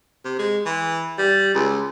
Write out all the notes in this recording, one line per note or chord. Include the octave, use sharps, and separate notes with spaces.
C3
G#3
E3
G3
C#2